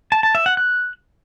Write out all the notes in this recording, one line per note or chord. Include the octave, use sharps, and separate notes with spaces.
A5
A5
E5
F#5
F#6